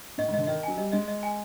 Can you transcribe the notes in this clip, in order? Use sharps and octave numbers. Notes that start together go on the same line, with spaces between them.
A2 D#5
G#2
D3 D#5
D#3 D#5
F#3 G#5
G3 D#5
G#3 D#5
D#5
G#5